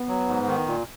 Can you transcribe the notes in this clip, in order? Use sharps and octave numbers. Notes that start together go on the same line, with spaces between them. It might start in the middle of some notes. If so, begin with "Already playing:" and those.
Already playing: B3
F#3
G#2
D#3
A#2